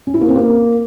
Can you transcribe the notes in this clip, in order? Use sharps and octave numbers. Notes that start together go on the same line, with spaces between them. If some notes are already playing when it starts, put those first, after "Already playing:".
C#4
E4
A#3
C4
A#3